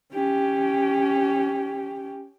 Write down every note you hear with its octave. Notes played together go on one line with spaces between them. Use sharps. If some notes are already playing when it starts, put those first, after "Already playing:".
C#4 G4